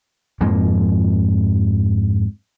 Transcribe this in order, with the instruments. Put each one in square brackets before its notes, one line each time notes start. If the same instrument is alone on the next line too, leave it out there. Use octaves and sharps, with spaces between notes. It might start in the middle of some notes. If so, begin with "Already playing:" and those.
[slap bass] F2 G#2 F3 A#3